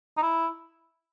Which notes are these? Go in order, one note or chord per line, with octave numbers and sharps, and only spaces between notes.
D#4
E4